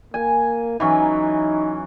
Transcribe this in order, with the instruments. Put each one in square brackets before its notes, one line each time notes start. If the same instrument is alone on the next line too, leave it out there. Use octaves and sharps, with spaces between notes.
[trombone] A#3 [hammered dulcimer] G#5
[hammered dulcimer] E3 F#3 C#4 [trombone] D#4